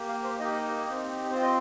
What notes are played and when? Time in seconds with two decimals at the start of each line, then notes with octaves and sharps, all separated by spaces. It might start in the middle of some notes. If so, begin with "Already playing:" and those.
Already playing: A#3 G4
0.09 F5
0.24 C5
0.39 A#3 D#4 G4 D#5
0.85 C4 D#4 G4
1.31 C4 F4 C5
1.42 D#5